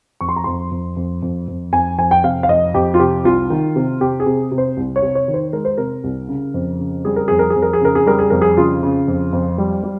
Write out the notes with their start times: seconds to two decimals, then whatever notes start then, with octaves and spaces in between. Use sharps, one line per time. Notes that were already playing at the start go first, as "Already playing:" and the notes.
0.21 F2 C#6
0.29 C6
0.36 A#5
0.44 F2 C6
0.71 F2
0.97 F2
1.22 F2
1.48 F2
1.73 F2 G#5
1.98 F2 G#5
2.11 G5
2.24 C3 F5
2.43 F5
2.49 F2 D#5
2.74 F2 G4
2.94 F4
2.99 C3 G4
3.24 C2 F4
3.50 D#3
3.76 C3
4.01 C3 G4
4.20 G#4
4.26 C3
4.52 C3
4.58 C5
4.77 C2
4.96 C#5
5.02 C3
5.15 C#5
5.28 D#3
5.34 C5
5.53 G#3 A#4
5.65 C5
5.78 C3 A#4
6.04 C2
6.28 C#3
6.54 F2
6.80 C#3
7.05 G3 G#4
7.16 A#4
7.28 F2 G#4
7.39 A#4
7.50 G#4
7.56 F2
7.62 A#4
7.73 G#4
7.81 C#3 A#4
7.95 G#4
8.07 G3 A#4
8.19 G#4
8.30 F2 A#4
8.42 G#4
8.57 C#3 F4
8.83 C#3
9.08 F2
9.33 F2
9.58 G3
9.83 G3